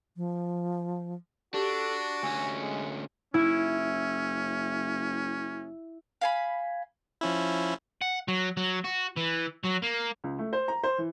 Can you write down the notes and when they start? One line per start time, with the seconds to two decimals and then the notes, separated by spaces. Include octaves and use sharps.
0.17 F3
1.54 D4 F#4 G4 A4
2.23 D2 C#4 G#5
2.61 G#3
3.34 F#1 C#4 E4
6.21 F5 G#5 B5
7.21 F3 C#4 E4
8.01 F#5
8.28 F#3
8.57 F#3
8.84 F#4
9.16 E3
9.64 F#3
9.82 A#3
10.24 C#2
10.39 A3
10.53 C5
10.68 A#5
10.83 C5
10.98 E3